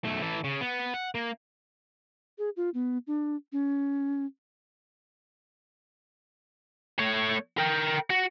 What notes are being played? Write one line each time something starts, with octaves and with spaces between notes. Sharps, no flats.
B1 A3
E3 A4
C#3
B3
F#5
A#3
G#4
F4
B3
D4
C#4
A3 C#5
A#4 G5
F#4